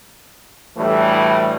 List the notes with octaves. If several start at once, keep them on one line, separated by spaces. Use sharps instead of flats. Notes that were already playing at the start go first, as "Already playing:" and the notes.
D2 A2 E3 G3 A3